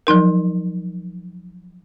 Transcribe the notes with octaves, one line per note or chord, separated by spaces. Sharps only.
F3 F#3 D#4 A#4